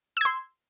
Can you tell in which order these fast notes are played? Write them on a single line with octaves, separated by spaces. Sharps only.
E6 G#6 C6